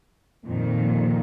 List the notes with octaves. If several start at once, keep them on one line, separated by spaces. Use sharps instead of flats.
F2 A#2 D#3